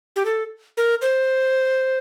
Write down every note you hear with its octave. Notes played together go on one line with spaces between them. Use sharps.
G4
A4
A#4
C5